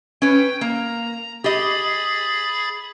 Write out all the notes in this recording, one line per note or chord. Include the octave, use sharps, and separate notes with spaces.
C#4 B4 G5
A#3 A#5
G4 G#4 D#5 B5 A6